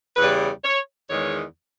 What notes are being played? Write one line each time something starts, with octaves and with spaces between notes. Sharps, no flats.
E2 C#3 G3 B4
C#5
E2 D#3 G#3 C#5